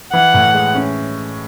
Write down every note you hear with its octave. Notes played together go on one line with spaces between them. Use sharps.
E3 F#5
A2
G#3
C#4